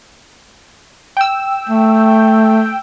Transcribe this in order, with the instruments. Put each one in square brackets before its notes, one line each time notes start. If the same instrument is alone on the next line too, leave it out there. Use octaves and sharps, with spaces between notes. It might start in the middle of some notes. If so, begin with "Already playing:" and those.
[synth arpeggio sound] G5 E6
[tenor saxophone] A3